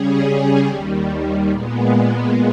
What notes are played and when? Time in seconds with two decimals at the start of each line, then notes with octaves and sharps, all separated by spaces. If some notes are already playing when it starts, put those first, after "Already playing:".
Already playing: C#3 G3 C#4 G#4
0.66 D#2 D#3 G3
1.50 A#2 G#3 B3